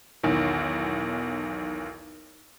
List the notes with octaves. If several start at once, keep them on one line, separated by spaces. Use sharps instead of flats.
B1 E2 D#3